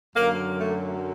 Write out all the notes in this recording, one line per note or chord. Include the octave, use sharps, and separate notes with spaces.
F#2 D3 F#3 A#3
A3